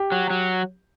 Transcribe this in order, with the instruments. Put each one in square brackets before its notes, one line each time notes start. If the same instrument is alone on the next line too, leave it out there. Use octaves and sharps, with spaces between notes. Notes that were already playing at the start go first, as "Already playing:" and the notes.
Already playing: [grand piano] G4
[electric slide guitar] F#3
F#3